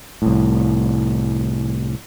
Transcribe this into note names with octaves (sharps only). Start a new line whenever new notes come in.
C2 A2